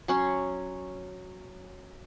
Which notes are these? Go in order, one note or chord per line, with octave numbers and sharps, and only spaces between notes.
F#3 C#4 C6